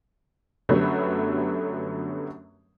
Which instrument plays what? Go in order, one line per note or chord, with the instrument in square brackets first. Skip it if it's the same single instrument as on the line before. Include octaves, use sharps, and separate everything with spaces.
[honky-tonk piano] F#2 D3 F#3 G3 A3 B3